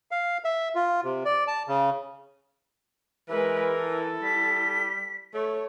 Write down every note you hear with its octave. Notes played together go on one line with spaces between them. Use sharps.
F5
E5
F4
C3
D5
A5
C#3
E3 G#3 A#4 B4
E4 A4
G3 B6
A3 C#5